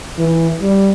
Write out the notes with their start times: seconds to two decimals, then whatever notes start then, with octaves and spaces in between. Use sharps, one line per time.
0.19 E3
0.62 G3